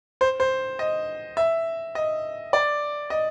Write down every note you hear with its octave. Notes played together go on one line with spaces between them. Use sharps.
C5
C5
D#5
E5
D#5
D5
D#5